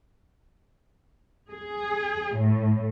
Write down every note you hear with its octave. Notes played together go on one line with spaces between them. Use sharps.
G#4
A2